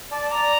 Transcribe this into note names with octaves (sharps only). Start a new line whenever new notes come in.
D5 A5
D5 A#5